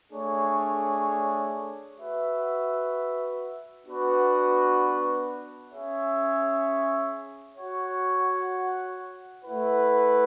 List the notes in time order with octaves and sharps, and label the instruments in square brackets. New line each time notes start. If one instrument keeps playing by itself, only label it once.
[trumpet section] A3 D4 G#4 C#5
F#4 B4 E5
B3 D4 F#4 B4
C#4 G#4 C#5 E5
F#4 C#5 F#5
A3 E4 B4 F#5